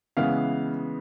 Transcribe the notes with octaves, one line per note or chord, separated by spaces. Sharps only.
C#3 E3 G#3 B3 F5